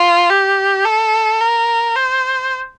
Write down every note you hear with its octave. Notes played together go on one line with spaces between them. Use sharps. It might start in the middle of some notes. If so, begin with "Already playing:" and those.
Already playing: F4
G4
A4
A#4
C5